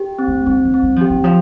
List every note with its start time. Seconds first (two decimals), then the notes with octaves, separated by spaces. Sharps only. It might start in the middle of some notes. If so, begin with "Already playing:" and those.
Already playing: G4
0.19 C4
0.28 A3
0.46 G3 C4
0.65 F3
0.74 C4
0.83 G3
0.96 F3 G4
1.10 E3
1.24 F3